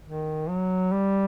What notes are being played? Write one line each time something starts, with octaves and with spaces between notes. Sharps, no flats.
D#3
F#3
G3